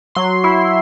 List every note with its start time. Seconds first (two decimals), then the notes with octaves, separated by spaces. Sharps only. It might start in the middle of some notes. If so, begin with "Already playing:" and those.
0.15 F#3 C6
0.44 E4